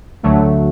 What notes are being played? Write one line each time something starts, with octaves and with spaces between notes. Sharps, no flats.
D2 D3 F#3 A3